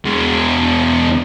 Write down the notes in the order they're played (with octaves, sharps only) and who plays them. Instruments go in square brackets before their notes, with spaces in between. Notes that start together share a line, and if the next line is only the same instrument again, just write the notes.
[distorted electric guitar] E2 G#3